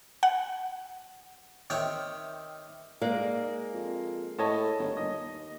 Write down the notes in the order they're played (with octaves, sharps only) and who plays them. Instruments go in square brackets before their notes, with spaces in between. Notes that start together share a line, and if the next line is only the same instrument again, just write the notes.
[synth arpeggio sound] F#5
[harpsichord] C3 D#3 C#5 G5
[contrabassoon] G#2 [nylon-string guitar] G#3 A#3 D5 [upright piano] F5
[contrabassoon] F2
[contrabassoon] A2 [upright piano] C#5 D#5 A5
[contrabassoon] G1
[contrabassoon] D#2 [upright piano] D#5